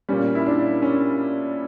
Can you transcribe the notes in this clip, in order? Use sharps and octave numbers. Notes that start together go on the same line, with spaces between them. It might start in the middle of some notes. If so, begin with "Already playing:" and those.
A#2 G3 C#4
E4
D4
C#4